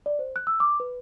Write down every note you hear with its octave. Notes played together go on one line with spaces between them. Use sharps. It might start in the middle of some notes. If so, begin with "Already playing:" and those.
D5
C5
F#6
E6
D6
B4